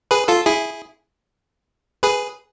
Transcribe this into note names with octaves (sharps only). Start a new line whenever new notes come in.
G#4 B4
F4 A4
E4 G#4
G#4 B4